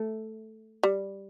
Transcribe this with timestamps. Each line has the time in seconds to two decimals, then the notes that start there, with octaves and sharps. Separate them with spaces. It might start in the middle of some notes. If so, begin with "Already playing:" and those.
Already playing: A3
0.83 G3